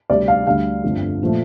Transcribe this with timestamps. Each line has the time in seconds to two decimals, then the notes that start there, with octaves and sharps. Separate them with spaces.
0.09 D2 C3 G3 D5
0.28 F5
0.46 D2 D3 G3 F5
0.84 G1 F2 D3 F3 A3
1.22 A#2 F3 A3